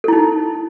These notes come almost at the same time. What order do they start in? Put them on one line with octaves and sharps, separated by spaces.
A4 E4 D#4